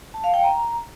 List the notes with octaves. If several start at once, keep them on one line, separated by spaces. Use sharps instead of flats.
A5
F5
G5
A#5